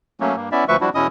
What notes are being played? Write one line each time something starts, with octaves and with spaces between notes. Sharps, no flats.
F#3 A3 A#3 C#4
G2 A#3
B3 C#4 E4 D5 E5
D2 F3 B4 E5 C#6
F3 G3 D4 E4 F#4
E2 B2 C#4 E4 D#5 D#6